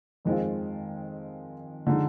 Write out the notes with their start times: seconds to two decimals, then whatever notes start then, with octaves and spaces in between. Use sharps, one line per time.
0.25 F2 D#3 G#3 C4 F4
1.87 D3 F3 G#3 D#4